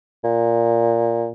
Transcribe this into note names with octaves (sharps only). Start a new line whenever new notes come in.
A#2